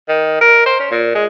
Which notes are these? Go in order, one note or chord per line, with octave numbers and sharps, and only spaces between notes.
D#3
A#4
C5
C#4
A#2
G#3